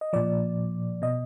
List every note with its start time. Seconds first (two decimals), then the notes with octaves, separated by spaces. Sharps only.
0.01 D#5
0.13 A#2 F3 D5
1.02 B2 D#5